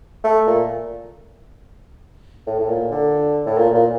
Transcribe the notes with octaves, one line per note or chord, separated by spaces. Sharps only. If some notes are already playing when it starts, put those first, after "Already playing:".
A3
A#2
A2
A2
A#2
D3
A2
A#2
A#2